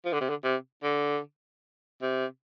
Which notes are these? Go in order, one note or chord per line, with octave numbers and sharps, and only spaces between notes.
F3
D3
C3
D3
C3
D3
C3